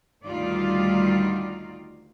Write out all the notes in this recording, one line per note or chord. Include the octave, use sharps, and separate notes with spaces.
D2 D#3 G3 D#4 F4 D5